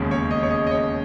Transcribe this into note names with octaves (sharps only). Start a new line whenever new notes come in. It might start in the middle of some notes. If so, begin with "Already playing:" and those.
Already playing: E1 D#2 C#3 G#3 C#4
C#5
D#5
C#5
D#5
D#5
C#5